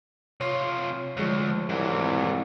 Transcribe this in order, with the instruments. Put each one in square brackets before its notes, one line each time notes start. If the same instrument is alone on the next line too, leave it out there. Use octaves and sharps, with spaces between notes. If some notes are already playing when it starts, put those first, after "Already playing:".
[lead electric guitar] C3 F4 [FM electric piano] C#5
[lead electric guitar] D2 [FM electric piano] F3 G#3 C#5
[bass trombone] C2 [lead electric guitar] G#2 E3